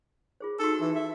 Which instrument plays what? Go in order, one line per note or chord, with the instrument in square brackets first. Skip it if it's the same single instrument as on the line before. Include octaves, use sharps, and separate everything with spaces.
[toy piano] F4 G#4 C5
[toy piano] D#4 F#4 [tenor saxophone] A4
[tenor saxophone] E3
E5